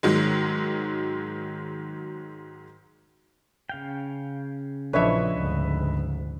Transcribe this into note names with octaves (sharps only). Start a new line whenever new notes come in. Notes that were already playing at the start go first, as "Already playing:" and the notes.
G#2 D#3 F#3 G#3
C#3 F5 G5
A#1 E3 F3 D4 B4 C#5 D#5 E5
D2 G#2